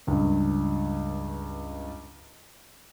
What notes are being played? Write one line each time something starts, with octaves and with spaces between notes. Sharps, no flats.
C#2 G2